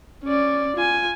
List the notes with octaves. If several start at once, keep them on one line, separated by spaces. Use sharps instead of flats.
C#4 D5
F4 G#5